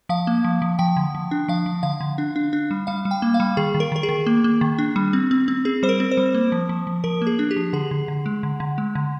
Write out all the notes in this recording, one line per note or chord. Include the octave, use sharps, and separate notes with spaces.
F3 F5
A#3
F3
F3
F3 G5
D3
F3
D4
F3 F5
F3
D3 F5
D3
D4
D4
D4
G3
G3 F5
G3
G5
A#3
F5
G3
D#3 G#4
D#3
A#4
D#3 A#4
G#4
D#3
A#3
A#3
D#3
D4
G3
C4
C4
C4
C4 G#4
G3 C5
A#4
C4
C5
G3
A#3
F3
F3
F3
F3 A#4
A#3
G#4
D4
G4
F3
D3 G#4
D3
D3
G#3
D3
D3
G#3
D3